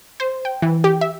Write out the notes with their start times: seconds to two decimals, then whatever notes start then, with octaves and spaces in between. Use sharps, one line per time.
0.20 C5
0.45 G5
0.62 E3
0.84 G4
1.01 E5